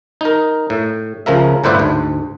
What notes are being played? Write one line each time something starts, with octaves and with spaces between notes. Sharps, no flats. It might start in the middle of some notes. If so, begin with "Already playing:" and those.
D#4 A#4
A2
C#2 C#3 F3 A#4 E5
G1 A2 B4 C5 D5 E5
D2 G#2